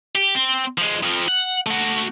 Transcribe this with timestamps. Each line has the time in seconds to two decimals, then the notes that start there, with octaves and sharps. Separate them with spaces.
0.15 G4
0.35 C4
0.78 F3 G#3
1.03 F2 F3
1.28 F#5
1.67 A3 F#4